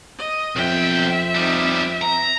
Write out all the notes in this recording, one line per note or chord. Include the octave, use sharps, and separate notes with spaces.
D#5
B1 F2 C4 E5 G5
G3 D#4
A#5